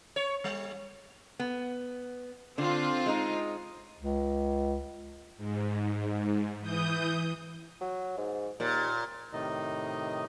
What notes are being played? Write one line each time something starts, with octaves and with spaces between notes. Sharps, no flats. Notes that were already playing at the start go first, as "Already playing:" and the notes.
C#5
G3
B3
D3 C4 F4
G#3 D#4
C#2
G#2
E3 D#6 G6
F#3
G#2
D#2 A#2
A2 C3 D#3 D#4 D#5